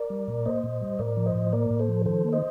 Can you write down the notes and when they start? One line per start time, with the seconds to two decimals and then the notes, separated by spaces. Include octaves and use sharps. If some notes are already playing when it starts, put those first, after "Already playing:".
Already playing: A#4 D5
0.10 G3
0.28 A#2
0.45 A#3 C5 D#5
0.64 A#2
0.82 G3
0.99 A2 A#4 D5
1.17 F3
1.26 C5 D#5
1.35 A2
1.52 A#3 A#4 D5
1.70 A2
1.80 A4 C5
1.88 F3
2.06 D#3 A4 C5
2.24 A#3
2.33 C5 D#5